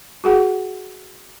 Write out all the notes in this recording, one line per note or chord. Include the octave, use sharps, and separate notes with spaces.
F#4 G#4 F#5